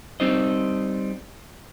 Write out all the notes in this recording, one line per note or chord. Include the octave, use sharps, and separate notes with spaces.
G3 C4 D#4 C5 D#5